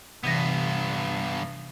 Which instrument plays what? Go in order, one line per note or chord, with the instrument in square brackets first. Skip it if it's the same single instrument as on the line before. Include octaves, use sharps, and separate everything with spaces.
[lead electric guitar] G2 B3 [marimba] C3 E3 A#6